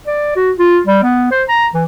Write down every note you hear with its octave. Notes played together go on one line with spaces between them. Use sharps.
D5
F#4
F4
G3
B3
C5
A#5
E3